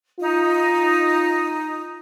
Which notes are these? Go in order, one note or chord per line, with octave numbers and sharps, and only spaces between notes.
D#4 F4